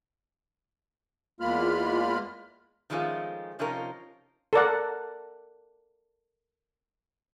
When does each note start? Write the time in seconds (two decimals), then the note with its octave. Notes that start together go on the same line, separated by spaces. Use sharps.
1.40 E2 G#3 A#3 F4 B5 F6
2.90 D#3 F3 G#3 A3 C#4 F4
3.59 C3 F3 C#4 D#4 F4 A#4
4.53 A4 A#4 D5 F#5